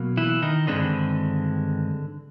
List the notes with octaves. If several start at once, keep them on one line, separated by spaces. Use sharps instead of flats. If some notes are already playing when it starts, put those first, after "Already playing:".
Already playing: B2 F#3 A#3
E3 E4
D#3 D#4
G2 D3 D#3 G#3 C4 D4